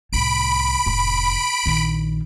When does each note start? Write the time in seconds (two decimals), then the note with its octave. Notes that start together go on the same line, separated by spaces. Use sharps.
0.13 C2 A2 B5 D7
0.86 F1 A2
1.66 A#1 D#3